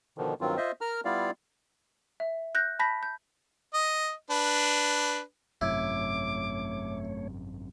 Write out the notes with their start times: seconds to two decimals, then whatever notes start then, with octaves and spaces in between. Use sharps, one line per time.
0.18 B2 D3 D#3 F3
0.41 G2 D#3 F#3 C4 F4
0.57 F4 C5 D#5 E5
0.81 A#4 A#5 F6
1.05 G3 B3 E4 F4 D5 F5
2.20 E5
2.55 F#6 G6 A#6
2.79 A5 B5 G6 A#6 B6
3.03 G6
3.74 D#5
4.30 D4 B4
5.61 G#1 F#2 C3 A3 E4 C#5 D6